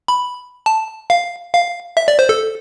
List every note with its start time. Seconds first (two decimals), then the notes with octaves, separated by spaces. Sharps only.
0.08 B5
0.66 A5
1.10 F5
1.53 F5
1.97 E5
2.08 D5
2.19 C5
2.29 A4